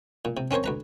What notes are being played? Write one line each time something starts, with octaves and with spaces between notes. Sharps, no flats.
A#2
C3
C4 C#4 A#4 C5 C#5
D2 B4 A#5